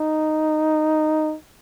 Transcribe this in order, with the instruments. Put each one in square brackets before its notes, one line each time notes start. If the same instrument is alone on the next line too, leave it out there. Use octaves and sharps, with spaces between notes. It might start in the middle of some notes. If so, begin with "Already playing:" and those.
Already playing: [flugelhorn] D#4